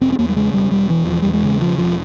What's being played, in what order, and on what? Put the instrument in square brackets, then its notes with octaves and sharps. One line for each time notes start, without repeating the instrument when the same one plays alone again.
[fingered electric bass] E1 C4
C4
E2 A#3
G3
C#3 G#3
E1 G3
E1 G3
E2 E3
E1 F3
E2 G3
G#3
C#3
E1 F3
E1 F3